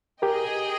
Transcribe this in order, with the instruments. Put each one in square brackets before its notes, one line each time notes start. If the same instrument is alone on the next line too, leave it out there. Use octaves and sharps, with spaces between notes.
[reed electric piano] G4 A#4 [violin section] G#4 D#5 G5